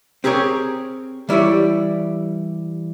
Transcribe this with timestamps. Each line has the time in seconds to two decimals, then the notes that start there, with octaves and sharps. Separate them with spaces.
0.24 C4 G4 G#4 A#4 C#5
1.29 E3 G3 E4 C#5 D5